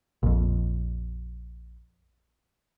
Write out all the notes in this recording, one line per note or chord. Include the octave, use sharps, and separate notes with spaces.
A#1 F2